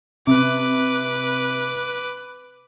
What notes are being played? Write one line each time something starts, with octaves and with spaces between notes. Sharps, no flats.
C3 B4 D6